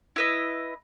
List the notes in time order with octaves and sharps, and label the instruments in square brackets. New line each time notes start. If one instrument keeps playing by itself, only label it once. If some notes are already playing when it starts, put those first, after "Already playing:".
[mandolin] E4 B4 D#5